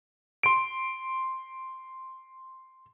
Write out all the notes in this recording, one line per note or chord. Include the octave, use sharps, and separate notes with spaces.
C6 D7